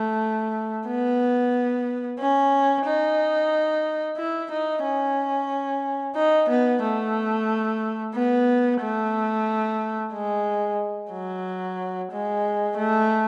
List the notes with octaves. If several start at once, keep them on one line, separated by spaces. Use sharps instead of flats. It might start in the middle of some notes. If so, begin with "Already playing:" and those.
Already playing: A3
B3
C#4
D#4
E4
D#4
C#4
D#4
B3
A3
B3
A3
G#3
F#3
G#3
A3